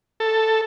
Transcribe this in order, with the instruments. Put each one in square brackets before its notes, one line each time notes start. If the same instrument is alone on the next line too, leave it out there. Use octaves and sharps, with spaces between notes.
[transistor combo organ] A4